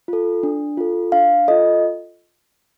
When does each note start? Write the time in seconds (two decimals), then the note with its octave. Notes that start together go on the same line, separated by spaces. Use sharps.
0.08 F4 A4
0.43 D4
0.77 F4 A4
1.12 D4 F5
1.48 F4 A4 D#5